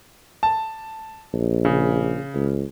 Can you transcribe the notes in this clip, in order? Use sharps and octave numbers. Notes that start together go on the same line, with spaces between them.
A5
A#1
C#3
C#2